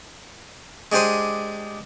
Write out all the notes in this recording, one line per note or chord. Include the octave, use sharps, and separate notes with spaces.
G#3 D4 G4 C5 D#6